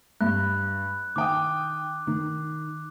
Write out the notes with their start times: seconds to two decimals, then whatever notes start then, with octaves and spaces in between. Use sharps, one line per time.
0.21 G2 F#6
1.16 D#3 G5 D6 D#6
2.07 D#3